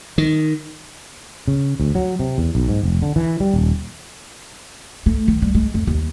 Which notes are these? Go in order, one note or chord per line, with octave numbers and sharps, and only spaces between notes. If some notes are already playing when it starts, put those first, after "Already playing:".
D#3
C#3
D2
F#3
C3
E2
B1
G#2
F1
D3
E3
G3
D#1
A3
D#3
G3
G#3
F2
D#2